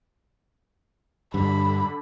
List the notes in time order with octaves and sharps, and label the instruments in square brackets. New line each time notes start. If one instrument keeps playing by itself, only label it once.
[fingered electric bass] G2 [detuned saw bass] D3 [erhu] B5